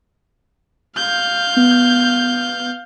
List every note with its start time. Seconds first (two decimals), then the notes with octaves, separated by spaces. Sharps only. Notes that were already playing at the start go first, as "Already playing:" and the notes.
0.96 F5 G6
1.56 B3